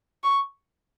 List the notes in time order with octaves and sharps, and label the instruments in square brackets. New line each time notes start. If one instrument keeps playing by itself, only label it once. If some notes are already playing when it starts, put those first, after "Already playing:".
[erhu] C#6